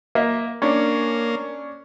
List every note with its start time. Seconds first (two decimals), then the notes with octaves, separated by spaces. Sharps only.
0.15 A#3 D#5 E5
0.62 A#3 C#4 D4